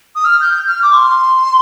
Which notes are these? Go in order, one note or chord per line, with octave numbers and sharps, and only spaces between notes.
D#6
F6
G6
F6
D6
C6